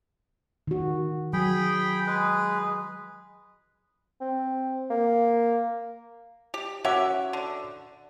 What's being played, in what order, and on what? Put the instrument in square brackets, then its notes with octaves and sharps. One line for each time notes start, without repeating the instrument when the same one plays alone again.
[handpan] D#3 F#4
[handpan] F#3 [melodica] G#4 G5 B5
[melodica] G#3 G#4 B4
[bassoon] C4
A#3
[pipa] G4
[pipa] C#4 A#4 E5 [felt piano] F#4 F#5 D6
[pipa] D3